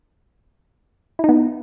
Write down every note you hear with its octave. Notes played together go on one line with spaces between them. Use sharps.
B3 D#4 E4